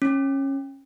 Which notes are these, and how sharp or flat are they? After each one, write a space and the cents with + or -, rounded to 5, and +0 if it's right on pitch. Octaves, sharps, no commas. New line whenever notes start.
C#4 -20